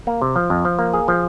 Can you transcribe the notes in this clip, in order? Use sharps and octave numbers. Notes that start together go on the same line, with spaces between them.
A#3
C3
F3
F2
F3
A#3
G#4
F3